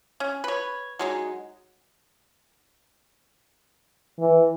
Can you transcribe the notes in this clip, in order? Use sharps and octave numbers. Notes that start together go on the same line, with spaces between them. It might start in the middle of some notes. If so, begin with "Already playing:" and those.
C#4
B4 C#5
F#3 G#3 D#4
E3